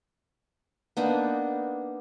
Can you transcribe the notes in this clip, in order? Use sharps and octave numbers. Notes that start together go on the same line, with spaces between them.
A#3 B3 D4 D#4